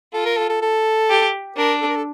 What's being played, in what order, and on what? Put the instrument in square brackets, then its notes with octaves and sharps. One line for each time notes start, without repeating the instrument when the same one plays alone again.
[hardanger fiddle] F4 [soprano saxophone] A4
[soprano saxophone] A#4
A4
A4
A4
[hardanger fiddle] G4
[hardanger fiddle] D4 [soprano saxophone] A#4
[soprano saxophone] A4
A#4
A4